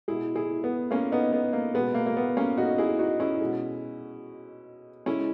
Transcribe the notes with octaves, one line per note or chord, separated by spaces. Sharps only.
B2 G#3 E4 G#4
E4 G#4
B3
A#3 C#4
B3 D#4
B3
A#3
B2 G#3 B3
A#3
A#3
B3
A#3 C#4
D#4 F#4
E4 G#4
D#4 F#4
C#4 E4
B2 G#3
C#3 G#3 C#4 E4